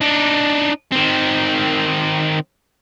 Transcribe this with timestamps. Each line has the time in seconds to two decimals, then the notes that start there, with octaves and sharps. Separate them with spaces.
0.01 D4 D#4
0.92 D#3 C4